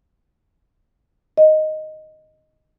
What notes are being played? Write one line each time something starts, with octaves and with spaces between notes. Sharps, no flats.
D#5